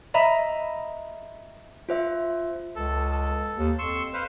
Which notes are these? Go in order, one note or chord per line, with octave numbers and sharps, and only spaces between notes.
D#5 E5 A#5 B5
F4 C5 E5
C#2 A4
A4
D#2
F2 C6 C#6 E6
B4 C5 F5